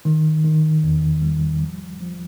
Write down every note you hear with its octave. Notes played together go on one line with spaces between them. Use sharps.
D#3
D#3
E2
G3
F3
F3